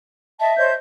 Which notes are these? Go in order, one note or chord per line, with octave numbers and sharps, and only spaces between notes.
D#5 E5 A5
C5 C#5 D#5 G6